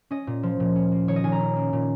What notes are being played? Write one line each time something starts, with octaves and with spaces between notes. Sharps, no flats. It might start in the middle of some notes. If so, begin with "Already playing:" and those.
C#4 D#5
A#2
F3
A#2
C#4
A#3
D#3 C#5
D#5
D#3 G#5
A#5
C#4
A#3
A#2